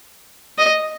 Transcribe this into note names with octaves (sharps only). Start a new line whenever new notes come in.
D#5